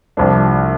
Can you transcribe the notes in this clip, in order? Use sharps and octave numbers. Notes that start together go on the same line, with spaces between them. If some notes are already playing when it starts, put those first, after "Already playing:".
C2 C3 F3 A3 D4